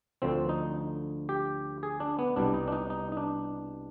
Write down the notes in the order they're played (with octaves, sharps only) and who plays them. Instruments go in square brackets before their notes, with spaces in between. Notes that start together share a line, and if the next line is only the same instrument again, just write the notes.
[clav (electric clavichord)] D2 D3 F3 C4
D#4
G4
G#4
D4
B3
C2 B2 G3 D4
D#4
D4
D#4
D#4
D#4
D4